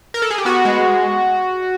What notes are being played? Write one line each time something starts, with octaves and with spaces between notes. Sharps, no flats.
A#4
A4
G#4
G4
B3 F#4
G#3